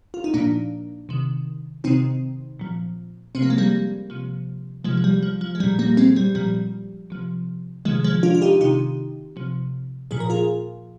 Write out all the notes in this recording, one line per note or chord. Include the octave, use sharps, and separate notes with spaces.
F4
D#4
A#2 F3 A#3 D4
C3 D#3
C3 D#3 C4 D#4
A#2 F3
C3 F3 C4
A#3
G#3
G3 A#3
C3 F3
C3 D#3 F3 G#3
F3
G3
F3
F3
G#3
A#2 F3 G3
G3 A#3
G#3 C4
G3
A#2 F3 G3
C3 F3
C3 D#3 F3 G#3
F3 G#3
D4 F4
F4
D#4 G4
C3 D#3 D#4 G4
C3 F3
A#2 F3 G#4
A#4
F4 G#4